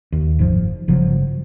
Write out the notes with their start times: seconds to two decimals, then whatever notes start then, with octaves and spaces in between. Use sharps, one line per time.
0.12 D#2
0.39 F#1 G#2 F3
0.88 G1 C#3 F3 F#3